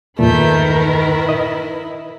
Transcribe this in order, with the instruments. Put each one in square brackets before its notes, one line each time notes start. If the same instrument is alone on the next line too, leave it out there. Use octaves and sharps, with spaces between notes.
[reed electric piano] E2 G2 A#2 [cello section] D#3 A#4 B4 [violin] A3 G6
[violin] E4
[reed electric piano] D#5